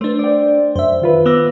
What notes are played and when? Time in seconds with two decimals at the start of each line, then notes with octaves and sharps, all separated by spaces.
0.01 A3 D4 C5
0.19 D5 G5
0.76 F#2 C5 E5
1.02 D#3 F4 B4
1.26 B3 D6 E6 A#6